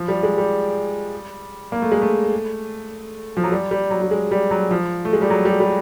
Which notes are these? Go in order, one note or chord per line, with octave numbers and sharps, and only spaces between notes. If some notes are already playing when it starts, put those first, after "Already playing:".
Already playing: F3
G3
G#3
G3
A#3
A3
G#3
A3
F3
F#3
G3
G3
F#3
G3
G#3
G3
F#3
F3
A3
G#3
G3
F#3
G3
G3